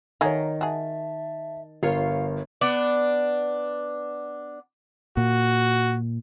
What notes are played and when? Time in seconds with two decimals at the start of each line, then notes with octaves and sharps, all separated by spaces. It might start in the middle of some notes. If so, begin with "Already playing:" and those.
0.21 D#3 A3 F#4 G#4 C#5 A#5
0.61 F#4 G#4 E5 A5
1.83 G1 F4 A#4 C#5 F5
2.61 B3 D4 D5
5.17 A#2 F#4